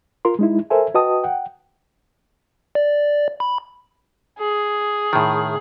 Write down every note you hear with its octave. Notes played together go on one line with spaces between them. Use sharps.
F4 A#4 C6
G#3 D#4 E4
A4 A#4 C5 E5 G#5
F#4 B4 D#5 G5 A5 D#6
F#5 G5
D5
B5
G#4
A2 D#3